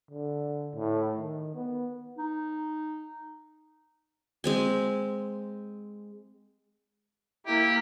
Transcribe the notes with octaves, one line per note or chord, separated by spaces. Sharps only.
D3
A2
D#3
B3
D#4
G#3 C4 G#5
A#3 E4 G4